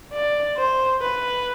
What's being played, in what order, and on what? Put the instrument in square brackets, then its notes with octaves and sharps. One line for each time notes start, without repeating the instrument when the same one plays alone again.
[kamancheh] D5
C5
B4